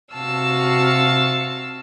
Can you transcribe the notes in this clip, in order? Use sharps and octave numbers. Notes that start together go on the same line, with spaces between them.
C3 F#4 F5 A5 E6